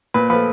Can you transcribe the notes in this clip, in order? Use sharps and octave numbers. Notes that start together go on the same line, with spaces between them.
A#2 B4
F3 A3 B4